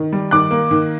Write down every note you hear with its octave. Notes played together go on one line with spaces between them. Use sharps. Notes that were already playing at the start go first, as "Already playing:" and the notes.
Already playing: D#3
G3
D#3 D6 F#6
A#3
D#3